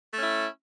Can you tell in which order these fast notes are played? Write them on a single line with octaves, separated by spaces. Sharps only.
A3 C#4 E4